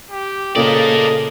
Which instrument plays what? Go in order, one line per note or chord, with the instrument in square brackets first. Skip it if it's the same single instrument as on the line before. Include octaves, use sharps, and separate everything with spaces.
[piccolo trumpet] G4
[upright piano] A#2 C#3 A#3 [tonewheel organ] A4 [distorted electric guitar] A#4 D5 [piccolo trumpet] D#5